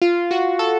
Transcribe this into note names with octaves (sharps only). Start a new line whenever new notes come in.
F4
F#4
A4